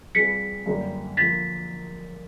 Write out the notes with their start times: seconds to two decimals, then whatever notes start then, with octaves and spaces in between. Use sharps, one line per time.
0.15 G3 C4 F4 G#4 B4 B6 C#7
0.66 F#2 D3 G3 A#3 D4
1.17 D3 F3 A#3 A6 B6